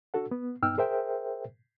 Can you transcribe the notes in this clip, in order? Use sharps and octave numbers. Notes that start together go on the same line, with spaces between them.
D4 F#4 A4 F#5
B3
G2 B3 D#4 G5 E6 F6
G#4 A#4 C5 E5 G5